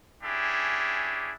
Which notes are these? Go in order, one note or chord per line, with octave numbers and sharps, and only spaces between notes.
C#4 D4 E4 G4 G#4